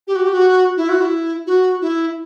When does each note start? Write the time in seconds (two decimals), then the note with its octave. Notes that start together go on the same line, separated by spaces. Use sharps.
0.07 G4
0.15 F#4
0.25 G4
0.33 F#4
0.77 E4
0.89 F#4
1.01 E4
1.47 F#4
1.81 E4